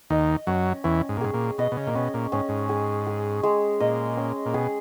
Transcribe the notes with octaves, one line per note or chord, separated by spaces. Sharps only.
D#2 D#3 D#5
F#2 F#3 C#4
E2 E3 C#4
G#2
A#2
G#2 G#4
A#2
B2 D#5
B2
C#3
A#2
B2 C#4
A#2
G#2 C#4
G#2
G#4
G#4
G#3
A#2 D#5
C#4
A#2
B2 G#4